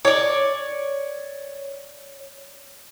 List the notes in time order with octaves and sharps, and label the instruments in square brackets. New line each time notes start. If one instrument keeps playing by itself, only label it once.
[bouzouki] C#5 D5